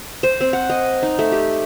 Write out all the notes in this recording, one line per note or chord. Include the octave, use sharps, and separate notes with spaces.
C5
C4
F#5
D#5
D#4
A3
G4